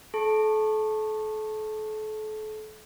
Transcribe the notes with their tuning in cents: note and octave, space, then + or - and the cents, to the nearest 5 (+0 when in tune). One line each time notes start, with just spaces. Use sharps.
A4 -35 A5 +0 C#6 -20